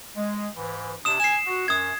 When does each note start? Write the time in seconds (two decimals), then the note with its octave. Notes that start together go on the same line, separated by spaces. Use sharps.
0.16 G#3
0.56 G#2 E3
1.05 C3 D4 D#6 E7
1.20 G#5 C7 E7
1.47 F#4
1.68 F#2 D#6 G#6